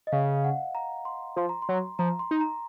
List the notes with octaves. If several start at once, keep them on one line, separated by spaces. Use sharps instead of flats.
D#5
C#3 F5
F#5
A#5
C6
F3 C6
A#5
C6
F#3
F3 A#5
C6
D#4
A#5